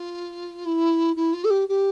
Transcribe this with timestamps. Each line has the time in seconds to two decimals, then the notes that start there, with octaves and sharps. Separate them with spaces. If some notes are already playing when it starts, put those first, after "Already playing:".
Already playing: F4
0.66 E4
1.16 E4
1.33 F4
1.44 A4
1.50 G4
1.68 G4